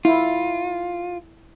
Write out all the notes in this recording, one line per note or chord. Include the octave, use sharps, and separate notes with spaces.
E4 F4